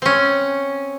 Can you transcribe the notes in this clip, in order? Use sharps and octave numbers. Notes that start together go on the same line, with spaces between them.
C4 C#4